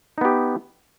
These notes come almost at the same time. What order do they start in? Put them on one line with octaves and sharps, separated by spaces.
D#4 B3 G4